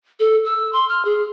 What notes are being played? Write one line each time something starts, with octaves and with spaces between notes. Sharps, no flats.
A4
E6
C6
F6
G#4